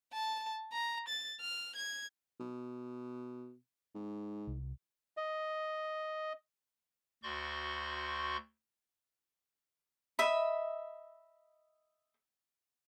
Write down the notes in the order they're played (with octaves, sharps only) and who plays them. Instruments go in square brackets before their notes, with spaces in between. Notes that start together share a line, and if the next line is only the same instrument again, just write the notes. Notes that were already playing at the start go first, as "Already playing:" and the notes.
[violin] A5
A#5
A6
F6
G#6
[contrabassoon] B2
G#2
[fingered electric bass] C2
[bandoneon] D#5
[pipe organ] D2 F#4 D5 C6 C#6 G6
[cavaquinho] D#5 E5 B5